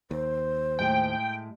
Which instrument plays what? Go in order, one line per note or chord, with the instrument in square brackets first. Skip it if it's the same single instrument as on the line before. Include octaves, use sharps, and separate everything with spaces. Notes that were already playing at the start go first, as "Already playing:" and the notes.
[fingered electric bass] D#2 [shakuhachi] C5
[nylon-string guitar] A2 G#3 [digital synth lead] G5